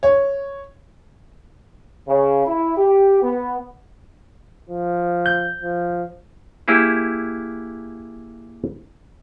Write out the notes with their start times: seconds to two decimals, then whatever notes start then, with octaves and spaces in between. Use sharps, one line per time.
0.03 C#5
2.08 C#3
2.46 E4
2.77 G4
3.22 B3
4.70 F3
5.26 G6
5.62 F3
6.68 A#3 E4 G4 G#4